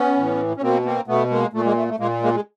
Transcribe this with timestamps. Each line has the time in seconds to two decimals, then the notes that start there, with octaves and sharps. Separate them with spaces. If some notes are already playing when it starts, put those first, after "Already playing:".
Already playing: B3 C#4
0.16 A2 E3
0.56 C#4
0.62 B2 A#3 C4
0.85 A#3 C4
1.07 B2 A3 B3
1.30 G#3 A#3
1.53 A#2 A3
1.65 G#3 A#3
1.76 A3
1.88 A3
1.99 A#2 G#3 A#3
2.22 G#3 A#3
2.33 G#3